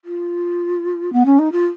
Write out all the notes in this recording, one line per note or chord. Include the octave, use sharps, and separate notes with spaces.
F4
B3
C#4
D#4
F4